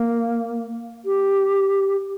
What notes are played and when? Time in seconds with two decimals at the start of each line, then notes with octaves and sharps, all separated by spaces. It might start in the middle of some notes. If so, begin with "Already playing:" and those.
Already playing: A#3
1.05 G4